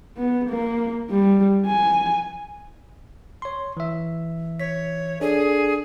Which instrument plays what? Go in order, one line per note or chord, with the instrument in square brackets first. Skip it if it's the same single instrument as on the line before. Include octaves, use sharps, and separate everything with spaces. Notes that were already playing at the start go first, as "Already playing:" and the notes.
[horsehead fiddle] B3
A#3
G3
G#5
[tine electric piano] C#5 C6
E3 E5
[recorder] C#5 [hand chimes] B6
[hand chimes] D4 A4 D5 [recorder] G#4